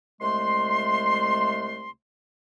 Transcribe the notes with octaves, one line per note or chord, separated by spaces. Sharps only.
C2 G#3 A3 C6